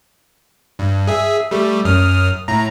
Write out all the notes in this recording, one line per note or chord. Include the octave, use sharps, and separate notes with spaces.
G2
G#4 E5
G3 A3
F#2 D#6 F6
A2 A#5